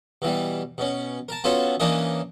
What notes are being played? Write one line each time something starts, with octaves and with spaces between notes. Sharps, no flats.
B2 E3 G3
B2 C#4
A#4 A5
B3 C#4 F4 F#4 A4 C#5
E3 A#3 C#4 D4 A#4 D#5